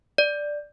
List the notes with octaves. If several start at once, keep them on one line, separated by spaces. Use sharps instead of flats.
D5